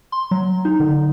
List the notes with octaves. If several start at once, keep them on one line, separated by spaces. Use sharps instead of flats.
C6
F#3
D#4
D3